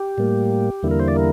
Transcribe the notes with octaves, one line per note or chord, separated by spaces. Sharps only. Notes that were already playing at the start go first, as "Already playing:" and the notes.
Already playing: G4
A2 G3 A#3
E2 D3 G3 A#3 E4
A#4
C5
D5
A#4